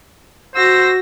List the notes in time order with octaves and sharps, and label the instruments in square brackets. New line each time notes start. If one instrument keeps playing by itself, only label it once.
[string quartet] F#4 E6 A#6 [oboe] C5